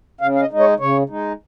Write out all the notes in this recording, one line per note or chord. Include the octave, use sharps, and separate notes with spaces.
C#3 F5
F5
D#5
G#3 D#4
C#5
C#3 C#5
G#3 D#4